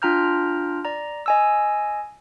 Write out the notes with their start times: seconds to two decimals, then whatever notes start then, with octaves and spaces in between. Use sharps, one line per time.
0.02 D4 F4 G5 A#5 F6 G6
0.85 D5 A#5
1.26 D#5 G#5 E6